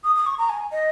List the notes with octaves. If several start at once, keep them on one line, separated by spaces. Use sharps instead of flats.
D#6
D#6
C#6
A#5
G#5
D#5